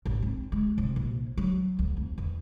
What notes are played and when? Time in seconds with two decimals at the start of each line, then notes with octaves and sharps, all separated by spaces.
0.05 A1
0.22 C4
0.52 G#3
0.78 C3
0.96 A#1
1.37 F#3
1.79 D2
1.97 F2
2.18 E2